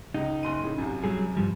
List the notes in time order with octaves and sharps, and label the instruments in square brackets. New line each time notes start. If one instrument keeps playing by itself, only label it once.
[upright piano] C#2 [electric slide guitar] D#4
[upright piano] F#1 C6 D#7
A2 C#3
C2 F#2
[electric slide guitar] F#3 G3 G#4
G2 F3 G3